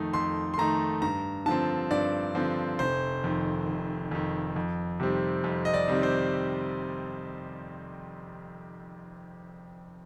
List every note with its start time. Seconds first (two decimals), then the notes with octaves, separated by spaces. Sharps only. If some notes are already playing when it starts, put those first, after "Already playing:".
Already playing: F2 D#3 A3 D#4
0.13 F2 C6
0.54 C6
0.58 D#3 A3 D#4 A#5
1.02 G2 A#5
1.46 D3 F3 C4 A5
1.91 G2 D5
2.35 D3 F3 C4
2.79 F1 C5
3.24 F2 D#3
3.67 F1
4.11 F2 D#3
4.56 F2
5.00 C3 D#3 G3 C4
5.44 F2
5.65 D#5
5.74 D5
5.88 C3 D#3 G3 C4
6.03 C5